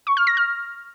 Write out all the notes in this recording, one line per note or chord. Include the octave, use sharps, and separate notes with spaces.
C#6
F6
A#6
F6